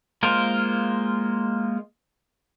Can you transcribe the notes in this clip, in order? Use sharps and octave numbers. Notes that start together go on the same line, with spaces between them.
G#3 A#3 F4 A#4 C5